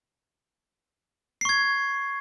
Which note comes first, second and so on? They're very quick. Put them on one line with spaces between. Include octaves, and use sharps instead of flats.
C7 C#6 G#6